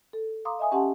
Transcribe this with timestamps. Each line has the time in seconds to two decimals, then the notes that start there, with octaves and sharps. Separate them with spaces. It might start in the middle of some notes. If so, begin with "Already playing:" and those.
0.13 A4
0.45 F5 A#5 C6 D6 D#6
0.59 D#5 E5 G#5 D#6
0.72 C#4 G4 F#5 G#5 A5 C6